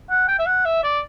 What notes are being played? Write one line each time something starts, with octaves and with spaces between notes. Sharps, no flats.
F#5
G5
E5
F#5
E5
D5